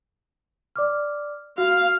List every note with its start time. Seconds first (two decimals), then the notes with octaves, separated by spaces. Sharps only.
0.76 D5 D6 F6
1.58 F#4 F5